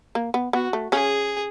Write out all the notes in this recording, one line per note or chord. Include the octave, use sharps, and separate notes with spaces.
A#3
B3
B3 F#4
A3
C#3 C#4 G#4